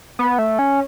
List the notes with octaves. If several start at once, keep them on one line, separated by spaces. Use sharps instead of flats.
B3
A3
C#4